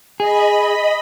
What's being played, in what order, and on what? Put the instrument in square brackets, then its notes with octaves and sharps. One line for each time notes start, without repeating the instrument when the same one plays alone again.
[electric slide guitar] G#4 [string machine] D#5 B5